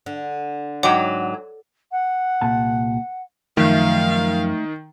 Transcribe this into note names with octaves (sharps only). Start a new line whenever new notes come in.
D3
G#2 F#3 C#5 F#5 G5 D6
F#5
C2 A#2 A5
F#2 D#3 F3 A3 F5